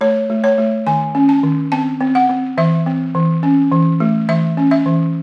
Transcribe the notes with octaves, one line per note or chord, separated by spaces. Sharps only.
A3 C#5
A3
C#5
A3
D#3 G#5
C#4
A5
D#3
C4 A5
C4
F#5
C4
E3 E5
C4
E3
C#4
E3
A3
E3 E5
C#4
E5
E3